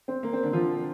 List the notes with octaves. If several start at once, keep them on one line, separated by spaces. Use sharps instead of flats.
C4
A#3
C4
D3 D4
F3 F4